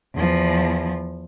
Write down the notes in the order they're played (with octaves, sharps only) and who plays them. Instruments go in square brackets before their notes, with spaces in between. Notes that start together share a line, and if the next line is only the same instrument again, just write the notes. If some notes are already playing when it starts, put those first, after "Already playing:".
[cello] E2 F3